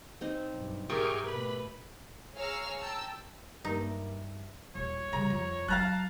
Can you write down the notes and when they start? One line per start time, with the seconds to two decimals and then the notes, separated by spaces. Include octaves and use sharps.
0.21 C4 D#4 D#5
0.51 B1 G2
0.90 G#2 G4 G#4 A#4 D5 E5 G5 C#6
1.27 B2 A3 B4 B5
2.36 G#4 C#5 F5 A#5 E6 F6
2.79 G5 A5 A#5 E6
3.65 G2 G3 A#3 D4 D#4 E5
4.75 D#1 C#5
5.13 C#3 G3 A#5
5.30 F2
5.68 F#3 F5 A5 A#5 F#6